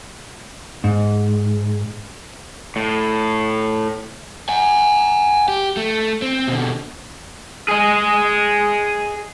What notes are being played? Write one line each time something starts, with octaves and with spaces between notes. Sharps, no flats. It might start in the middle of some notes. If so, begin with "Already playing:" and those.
G#2
A2
F#5 G#5
G4
A3
C4
B2 D3
G#4 D#5